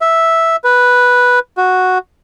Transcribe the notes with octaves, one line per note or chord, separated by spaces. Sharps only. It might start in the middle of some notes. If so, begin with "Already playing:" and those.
E5
B4
F#4